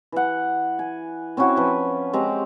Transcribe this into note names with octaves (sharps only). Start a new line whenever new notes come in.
E3 F#5
G#5
C4 C#4 E4 F#4
F3 B4
G#3 C4 G4 A#5